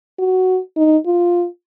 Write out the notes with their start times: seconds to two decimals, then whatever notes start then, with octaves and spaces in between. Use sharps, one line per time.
0.19 F#4
0.77 D#4
1.06 F4